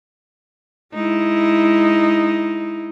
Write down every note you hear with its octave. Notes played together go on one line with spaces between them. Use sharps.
G#3 D#4 E4